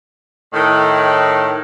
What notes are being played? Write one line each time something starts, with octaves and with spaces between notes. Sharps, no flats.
A2 D#3